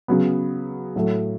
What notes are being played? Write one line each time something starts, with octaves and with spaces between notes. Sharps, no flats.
C#3 F#3 B3
A2 F#3 A3